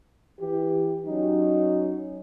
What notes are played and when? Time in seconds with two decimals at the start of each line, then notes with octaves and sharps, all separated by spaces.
0.40 E3 G4
1.06 F#3 C#4 D#4